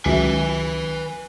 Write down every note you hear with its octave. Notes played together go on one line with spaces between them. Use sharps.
C#2 F#3 F#4 B4 E5 G#5